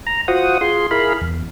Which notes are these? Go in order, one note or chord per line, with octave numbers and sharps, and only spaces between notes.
A#5
F4 F#4 C5 F#5 D#6
F4 G#4 C6
E4 G#4 A#4 F5 B5
E2